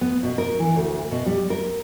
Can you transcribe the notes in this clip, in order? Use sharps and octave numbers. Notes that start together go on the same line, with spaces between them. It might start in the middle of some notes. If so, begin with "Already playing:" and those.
B3
B2
A#4
E3
D2
B2
G3
A#4